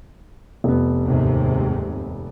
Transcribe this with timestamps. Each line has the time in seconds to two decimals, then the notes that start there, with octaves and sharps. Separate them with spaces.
0.64 F1 B3
1.08 D#2 G#2 C3